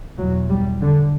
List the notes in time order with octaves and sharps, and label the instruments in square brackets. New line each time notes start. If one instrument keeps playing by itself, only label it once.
[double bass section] E2 B2 F#3
G3
D3